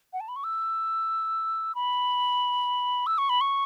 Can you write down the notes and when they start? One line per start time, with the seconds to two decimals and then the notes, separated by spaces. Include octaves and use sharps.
0.13 F#5
0.20 A5
0.28 B5
0.36 C#6
0.44 E6
1.75 B5
3.07 E6
3.18 C#6
3.29 B5
3.41 C#6